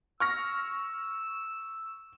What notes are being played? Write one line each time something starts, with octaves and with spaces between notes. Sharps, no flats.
C#6 E6 F6 A#6